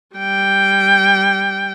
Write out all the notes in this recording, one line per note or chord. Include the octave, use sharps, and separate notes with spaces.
G3 G5